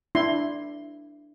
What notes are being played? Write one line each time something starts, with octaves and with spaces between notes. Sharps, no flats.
D4 E4 C6